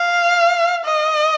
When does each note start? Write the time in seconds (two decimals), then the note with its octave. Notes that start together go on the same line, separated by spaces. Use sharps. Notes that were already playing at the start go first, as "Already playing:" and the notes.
Already playing: F5
0.85 D#5